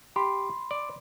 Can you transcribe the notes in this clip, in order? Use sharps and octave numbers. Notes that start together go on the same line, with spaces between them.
G4 B5 C6
D5